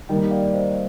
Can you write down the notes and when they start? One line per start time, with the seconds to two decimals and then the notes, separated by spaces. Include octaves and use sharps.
0.09 D#3 G3 A#3 D#5 G5
0.31 D5 F5
0.54 C5 D#5